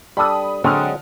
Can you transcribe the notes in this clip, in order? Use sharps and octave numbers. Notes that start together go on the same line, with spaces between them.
G3 D4 A4 B5 D#6
D3 F#3 G#3 C4 D#6 F6